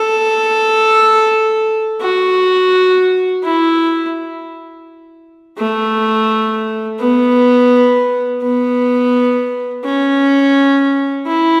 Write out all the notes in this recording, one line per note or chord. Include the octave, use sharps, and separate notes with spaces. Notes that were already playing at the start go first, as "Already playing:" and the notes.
Already playing: A4
F#4
E4
A3
B3
B3
C#4
E4